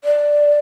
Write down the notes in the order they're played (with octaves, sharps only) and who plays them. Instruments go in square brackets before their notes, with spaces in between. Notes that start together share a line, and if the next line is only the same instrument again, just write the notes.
[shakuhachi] D5